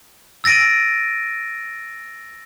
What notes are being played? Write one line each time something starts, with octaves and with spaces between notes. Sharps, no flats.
E6 A6 A#6 D7 D#7